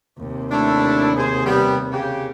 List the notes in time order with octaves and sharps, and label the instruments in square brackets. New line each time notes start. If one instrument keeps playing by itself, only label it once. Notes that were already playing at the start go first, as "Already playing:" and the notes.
[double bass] D#2 C3
[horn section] A3 D4 E4
G#4 C5
G3 B3
C#3 G4